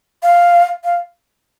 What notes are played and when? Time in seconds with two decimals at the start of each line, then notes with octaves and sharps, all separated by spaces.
0.23 F5
0.84 F5